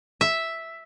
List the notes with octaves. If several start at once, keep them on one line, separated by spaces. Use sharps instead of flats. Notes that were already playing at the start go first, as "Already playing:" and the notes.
E5